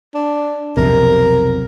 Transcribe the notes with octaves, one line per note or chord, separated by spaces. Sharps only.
D4
B1 F2 C3 A#4